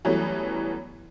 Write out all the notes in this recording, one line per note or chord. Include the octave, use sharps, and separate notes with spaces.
E3 F#3 G3 A3 B3 C#4